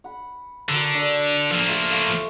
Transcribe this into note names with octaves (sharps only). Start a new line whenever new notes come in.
F#5 B5
D3 F#4 A#4
D4 A4
F3 A#3
A3 F4 G4
F5 C#6